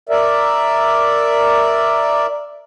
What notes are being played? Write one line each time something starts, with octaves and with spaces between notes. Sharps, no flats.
A#4 D5 E5